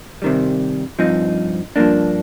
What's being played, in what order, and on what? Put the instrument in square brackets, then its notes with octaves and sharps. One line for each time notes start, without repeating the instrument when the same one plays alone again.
[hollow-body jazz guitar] C3 D#3 G3
G2 F3 C4 D#4
G2 F3 A#3 D4